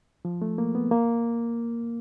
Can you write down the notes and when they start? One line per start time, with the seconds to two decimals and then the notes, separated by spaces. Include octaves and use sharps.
0.25 F3
0.42 A3
0.58 A#3
0.75 B3
0.91 A#3